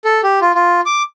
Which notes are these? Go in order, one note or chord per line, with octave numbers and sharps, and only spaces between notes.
A4
G4
F4
F4
D6